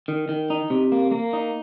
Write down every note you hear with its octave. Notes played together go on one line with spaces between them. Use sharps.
D#3
D#3
D#4
C3
A#3
A#3
D#4